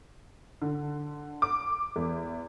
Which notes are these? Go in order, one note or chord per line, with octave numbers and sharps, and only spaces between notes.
D3
D6
E2